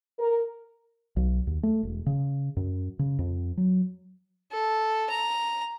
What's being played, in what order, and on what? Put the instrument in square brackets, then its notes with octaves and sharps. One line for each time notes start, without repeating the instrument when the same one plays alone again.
[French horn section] A#4
[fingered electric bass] B1
D#2
A3
E1
C#3
F#2
C#3
F2
F#3
[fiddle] A4
A#5